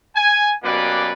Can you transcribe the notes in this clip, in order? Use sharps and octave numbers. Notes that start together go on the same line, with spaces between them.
G#5
F#2 B2 A#3 G4 B4 D5